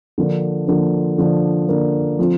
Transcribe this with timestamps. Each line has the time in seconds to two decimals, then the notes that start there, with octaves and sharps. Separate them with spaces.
0.18 D3 F3 A#3 D4
0.68 D3 F3 A#3 D4
1.18 D3 F3 A#3 D4
1.68 D3 F3 A#3 D4
2.19 F3 A3 C4 F4